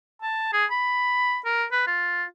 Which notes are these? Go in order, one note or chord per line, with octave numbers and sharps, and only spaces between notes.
A5
G#4
B5
A#4
B4
F4